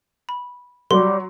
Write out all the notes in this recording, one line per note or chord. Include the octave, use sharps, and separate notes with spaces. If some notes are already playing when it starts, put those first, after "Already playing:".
B5
F#3 G3 F#4 C6